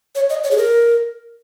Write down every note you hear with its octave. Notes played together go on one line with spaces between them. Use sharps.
C#5
D#5
C#5
G#4
A#4